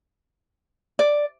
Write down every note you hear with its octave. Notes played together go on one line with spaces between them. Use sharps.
D5